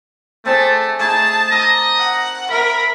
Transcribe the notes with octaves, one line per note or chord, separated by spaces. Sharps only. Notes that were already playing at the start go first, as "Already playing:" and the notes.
A3 C4 D4 G#4 A5
A3 D#4 G#4 A5
G4 A#4 D#5
F#5
A#4 E5 A#5 B5